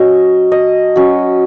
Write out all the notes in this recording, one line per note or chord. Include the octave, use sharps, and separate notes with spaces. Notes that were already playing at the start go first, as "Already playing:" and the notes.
Already playing: F#3 C#4 C#5 D#5
D#5
F#3 C#4